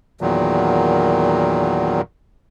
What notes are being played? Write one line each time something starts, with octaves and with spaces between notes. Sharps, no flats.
E2 A#2 D#3 F#3